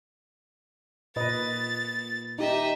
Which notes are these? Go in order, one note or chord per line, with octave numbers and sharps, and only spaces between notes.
A#2 B4 D#5 A6
D#4 G4 D#5 E5